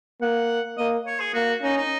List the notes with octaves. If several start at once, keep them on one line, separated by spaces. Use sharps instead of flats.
A#3 F#5
A#3 D#5
C#5
G#4
A#3 F#4
C#4 D#4
D#4